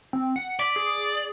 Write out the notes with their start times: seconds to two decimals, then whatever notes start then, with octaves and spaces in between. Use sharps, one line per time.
0.13 C4
0.36 F#5
0.59 D5 B6
0.76 G#4